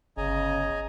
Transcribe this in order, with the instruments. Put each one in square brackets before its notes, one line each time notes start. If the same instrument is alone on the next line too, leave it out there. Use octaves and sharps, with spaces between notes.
[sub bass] G1 [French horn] C#3 [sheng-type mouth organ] D#5 G#5 A#5